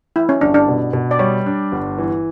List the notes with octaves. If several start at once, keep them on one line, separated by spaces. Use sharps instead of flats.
E3 E4
C#4
G1 D4
D4
B2
B2
D5
G3 C#5
D4
G1
E3